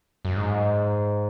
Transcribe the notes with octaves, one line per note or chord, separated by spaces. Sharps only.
F#2
G#2